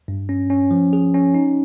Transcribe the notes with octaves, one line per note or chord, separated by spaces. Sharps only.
G2
C#4
C#4
F3
G#4
C#4
D#4